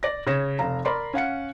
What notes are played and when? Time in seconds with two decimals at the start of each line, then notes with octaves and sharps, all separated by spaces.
0.03 D5 A#6
0.27 C#3 C#5 A#6 E7
0.59 F1 F5 A#5
0.85 A#4 D5 B5 C6
1.14 C#4 F5 F#5 C#7